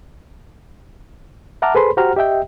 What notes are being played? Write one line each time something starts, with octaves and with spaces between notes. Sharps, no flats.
E5 F#5 A5 A#5 D6 F6
G#4 A4 B4 C5 B5 C6
F#4 G4 C5 F#5 A#5 F6
G4 D#5 E5 G5